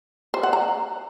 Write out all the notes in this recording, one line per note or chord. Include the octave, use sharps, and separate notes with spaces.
C5
F#5
A#5